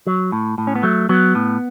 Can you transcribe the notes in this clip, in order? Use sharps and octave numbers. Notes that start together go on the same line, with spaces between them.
F#3
A2
A2
C#4
B3
F#3 A3
F#3 B3
A2